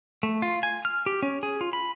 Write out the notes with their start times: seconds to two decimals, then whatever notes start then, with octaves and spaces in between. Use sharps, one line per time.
0.23 A3
0.42 F4
0.63 G#5
0.85 F6
1.06 G4
1.23 C#4
1.43 G#4
1.61 F4
1.73 B5